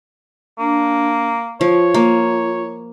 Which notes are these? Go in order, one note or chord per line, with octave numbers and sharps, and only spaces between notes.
A#3 D4
F3 F4 C#5
A#3